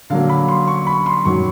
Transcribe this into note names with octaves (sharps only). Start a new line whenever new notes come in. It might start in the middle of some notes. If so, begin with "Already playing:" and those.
D3 F#3 A#3 F5
B5
C6
C#6
B5
C6
F#2 D#3 F#3 C#6